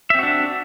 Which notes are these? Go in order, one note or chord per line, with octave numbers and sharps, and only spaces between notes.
C4 D4 F#4 E5